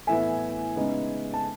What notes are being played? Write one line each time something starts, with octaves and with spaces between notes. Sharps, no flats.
A2 E3 B3 E5 G#5
C#3 G#3 B3 D#4
A5